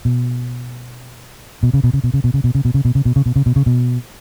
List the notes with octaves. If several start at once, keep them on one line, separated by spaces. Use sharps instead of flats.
B2
B2
C#3
B2
C#3
B2
C#3
B2
C#3
B2
C#3
B2
C#3
B2
C#3
B2
C#3
B2
C#3
B2
C#3
B2